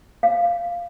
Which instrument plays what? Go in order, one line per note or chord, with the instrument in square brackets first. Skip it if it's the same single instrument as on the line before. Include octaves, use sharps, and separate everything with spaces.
[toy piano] F5